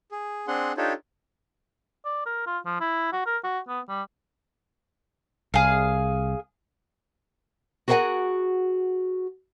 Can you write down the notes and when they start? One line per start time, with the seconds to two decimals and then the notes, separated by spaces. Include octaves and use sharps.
0.11 G#4
0.48 C4 D4 G#4 F#5 C6
0.77 D4 D#4 F4 G4 A4 C#5
2.05 D5
2.26 A#4
2.47 F4
2.66 F3
2.81 E4
3.13 F#4
3.26 A#4
3.44 F#4
3.68 B3
3.89 G3
5.54 C2 G#4 F5
7.88 F#4 G#4 A#4 C5 F#5 G#5